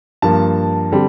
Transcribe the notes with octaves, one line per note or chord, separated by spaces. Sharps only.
G2 F3 A#3 A5
D3 G3 C4